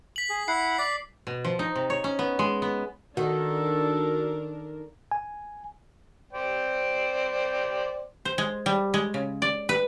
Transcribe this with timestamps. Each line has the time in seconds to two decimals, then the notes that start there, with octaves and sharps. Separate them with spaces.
0.16 B6 F#7
0.29 G#4
0.48 E4 F#5 C7
0.79 D5 B6
1.27 B2
1.44 F3
1.59 D#4
1.76 C3
1.90 C#5
2.04 C#4
2.19 B3
2.39 G#3
2.62 B3
3.17 D#3 D4 F#4 A4 A#4
5.11 G#5
6.33 C5 D5 G5
8.25 C5
8.38 G#3
8.66 G3
8.94 G#3
9.14 C#3
9.42 D5
9.69 B4